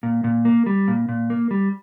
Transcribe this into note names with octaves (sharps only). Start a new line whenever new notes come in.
A#2
A#2
A#3
G3
A#2
A#2
A#3
G3